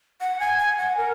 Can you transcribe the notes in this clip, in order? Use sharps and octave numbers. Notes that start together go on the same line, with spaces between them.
F#5
G#5
G#5
F#5
A#4